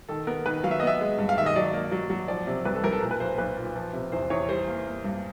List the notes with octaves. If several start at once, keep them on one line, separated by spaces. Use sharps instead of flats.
D#3 A4
B3 A#4
D#3 B4
F#3 F5
E5
D#5
B3 E5
G#3
G2
F5
D#3 E5
D#5
F#3 D5
A#3
F#3
F#3
F3 D5
C3
C2 B4
A4
C2 A#4
A4
A#2 A#4
B4
B1 C5
B1 B4
A#2
F3
C3
E2 C5
E2 C#5
G3 C5
A#3
A#3
G2